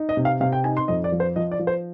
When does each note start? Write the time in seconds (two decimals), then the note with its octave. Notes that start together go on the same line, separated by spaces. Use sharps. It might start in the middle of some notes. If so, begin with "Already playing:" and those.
Already playing: D#4
0.09 D#5
0.17 C3
0.25 F5
0.41 C3 F5
0.53 G5
0.64 D#4 G#5
0.77 C6
0.88 F2 D#5
1.04 D5
1.12 F3
1.20 C5
1.36 F3 D#5
1.52 D5
1.59 F3
1.67 C5